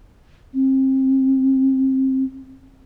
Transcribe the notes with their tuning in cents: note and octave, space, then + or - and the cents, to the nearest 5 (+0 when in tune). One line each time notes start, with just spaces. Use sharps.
C4 +25